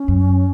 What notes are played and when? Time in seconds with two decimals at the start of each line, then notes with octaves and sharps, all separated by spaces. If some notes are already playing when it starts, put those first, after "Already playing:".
Already playing: C#4
0.08 F#2